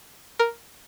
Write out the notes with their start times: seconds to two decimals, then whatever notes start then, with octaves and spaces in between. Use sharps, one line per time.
0.39 A#4